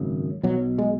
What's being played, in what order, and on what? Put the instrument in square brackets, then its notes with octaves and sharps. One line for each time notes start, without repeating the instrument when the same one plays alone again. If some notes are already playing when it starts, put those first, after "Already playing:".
Already playing: [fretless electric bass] G#1 F#2 C#3
B1 B2 F#3
G#3